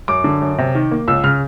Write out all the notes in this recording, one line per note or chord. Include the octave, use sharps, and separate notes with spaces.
F#2 D6
D3
F#2
C3
D#3
A#3
C#2 E6
C#3 F6